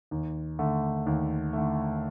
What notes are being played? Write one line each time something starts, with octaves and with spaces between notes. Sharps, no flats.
D#2
D3 A3
D#2
D3 A3